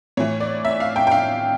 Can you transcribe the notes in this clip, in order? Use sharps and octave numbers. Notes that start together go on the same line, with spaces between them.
A2 E3 C#5
D5
E5
F5
G5
G5
F5